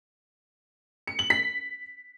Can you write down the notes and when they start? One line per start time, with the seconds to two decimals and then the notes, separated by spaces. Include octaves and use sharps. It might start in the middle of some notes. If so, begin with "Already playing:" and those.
1.07 C#7
1.19 F#7
1.30 B6